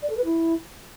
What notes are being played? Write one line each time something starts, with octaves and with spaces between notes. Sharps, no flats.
D5
A4
B4
E4